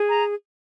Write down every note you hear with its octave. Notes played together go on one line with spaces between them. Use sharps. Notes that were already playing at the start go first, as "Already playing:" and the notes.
Already playing: G#4
A#5